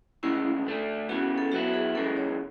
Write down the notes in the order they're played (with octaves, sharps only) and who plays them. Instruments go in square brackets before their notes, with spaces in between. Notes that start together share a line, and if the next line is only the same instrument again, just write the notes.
[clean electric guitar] D2 C#3 G#3 [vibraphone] E4
[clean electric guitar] D3 A3 D4
[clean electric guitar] C#3 E3 B3 [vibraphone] F#4
[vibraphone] A4
[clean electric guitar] F#3 B3 E4 [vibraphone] F#4
[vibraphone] G#4
[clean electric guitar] F#2 C#3 E3 G#3 [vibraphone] A4
[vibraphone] C#5